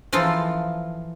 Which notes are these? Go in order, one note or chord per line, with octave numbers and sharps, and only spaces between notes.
E3 F3 D#4 F4 A4